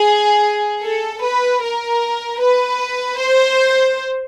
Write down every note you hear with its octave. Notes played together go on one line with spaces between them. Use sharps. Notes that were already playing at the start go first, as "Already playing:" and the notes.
Already playing: G#4
A4
B4
A#4
B4
C5